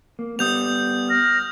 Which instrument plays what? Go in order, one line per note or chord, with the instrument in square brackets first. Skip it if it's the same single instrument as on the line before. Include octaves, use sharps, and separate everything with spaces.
[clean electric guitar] A#3
[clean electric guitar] G3 B3 [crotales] D#6 G6 F7
[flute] F6 [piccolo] A#6